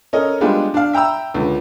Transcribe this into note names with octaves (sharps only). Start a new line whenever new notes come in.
C#4 A4 A#4 D#5
G3 G#3 B3 D4 F4
D4 F5
E5 G5 A#5 B5 E6
C#2 D3